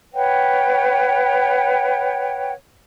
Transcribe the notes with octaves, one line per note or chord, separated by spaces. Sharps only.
B4 C#5 F#5 G5